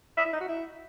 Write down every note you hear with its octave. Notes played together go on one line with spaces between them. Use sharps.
E5
E4
D#4
F#4
E4